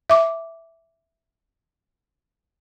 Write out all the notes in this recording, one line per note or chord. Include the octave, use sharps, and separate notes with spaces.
E5 D6